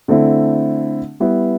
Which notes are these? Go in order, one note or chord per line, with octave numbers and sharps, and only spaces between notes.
D3 A3 C4 E4
G3 B3 E4